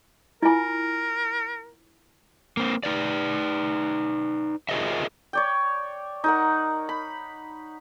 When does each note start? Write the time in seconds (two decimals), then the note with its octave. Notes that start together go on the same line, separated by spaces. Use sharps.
0.43 E4 F4 A#4 G#5
2.57 A#3 C4
2.83 D#4 B4 D5
4.69 F4 G#4 A#4 C5 D#5 E5
5.33 C#5 D5 G5
6.24 D#4 A#4 F#5
6.89 B5